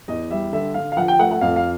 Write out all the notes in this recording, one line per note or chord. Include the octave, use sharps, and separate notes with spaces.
E2 D#5
G3 E5
D3 E5
D3 F5
F5
F3 F#5
G5
A3 F#5
F#5
F2 F5
F5